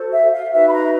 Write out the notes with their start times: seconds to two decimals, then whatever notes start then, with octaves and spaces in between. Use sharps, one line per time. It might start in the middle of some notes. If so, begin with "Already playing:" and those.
Already playing: F#4 A4 C5
0.12 E5
0.32 F5
0.51 D#4 F#4 B4 E5
0.66 B5
0.71 A#5